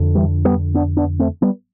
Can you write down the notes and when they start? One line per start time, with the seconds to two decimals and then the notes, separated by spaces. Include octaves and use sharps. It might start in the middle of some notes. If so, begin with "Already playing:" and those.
Already playing: F2 D3
0.15 E3 G3
0.45 G3 B3
0.74 B3 D4
0.97 B3 D4
1.19 A3 C4
1.42 G3 B3